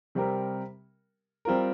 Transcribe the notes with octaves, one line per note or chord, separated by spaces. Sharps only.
C3 G3 C4 G4 A#4
G3 C4 F4 A#4